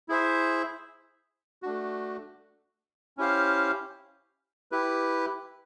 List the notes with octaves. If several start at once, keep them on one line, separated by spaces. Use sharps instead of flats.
E4 G#4 C5 E5
A3 D4 F#4
C#4 E4 G4 C5 F5
E4 G4 B4